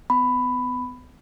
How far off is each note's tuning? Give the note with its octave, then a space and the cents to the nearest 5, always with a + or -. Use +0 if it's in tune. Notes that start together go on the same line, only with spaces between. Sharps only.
B3 +25 B5 +10